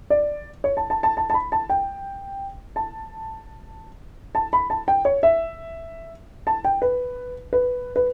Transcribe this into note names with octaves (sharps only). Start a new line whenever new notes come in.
D5
C#5
A5
A5
A5
A5
A5
B5
A5
G5
A5
A5
B5
A5
G5
C#5
E5
A5
G5
B4
B4
B4